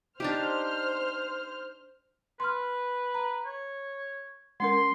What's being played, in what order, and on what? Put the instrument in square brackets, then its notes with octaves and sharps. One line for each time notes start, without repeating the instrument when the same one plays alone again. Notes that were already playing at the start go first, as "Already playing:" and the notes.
[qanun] D4 D#4 G4 [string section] C5 F6
[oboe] B4 [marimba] C6 F6
[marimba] A#5
[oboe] C#5
[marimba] G#3 C#4 A#4 [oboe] C6